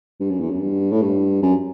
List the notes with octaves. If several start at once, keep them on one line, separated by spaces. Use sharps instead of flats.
G2
F#2
E2
F#2
G2
A2
G2
F#2